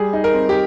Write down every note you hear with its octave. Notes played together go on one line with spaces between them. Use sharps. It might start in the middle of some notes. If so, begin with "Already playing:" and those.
Already playing: G3 G#4
D#4
A#4
C4
G4